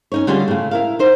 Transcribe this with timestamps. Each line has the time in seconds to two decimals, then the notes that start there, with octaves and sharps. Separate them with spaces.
0.12 C#4 D#4 C#5
0.27 D3 G3 C#4 F4 G4 G#4
0.48 A2 C#3
0.71 E4 A#4 F5
0.99 D#4 C5 D#5